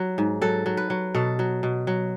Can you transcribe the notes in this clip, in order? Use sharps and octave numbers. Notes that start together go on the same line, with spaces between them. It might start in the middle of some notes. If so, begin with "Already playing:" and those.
Already playing: F#3
G#2
F#3 A4
F#3
B4
F#3
B2 A4
F#3
B2
F#3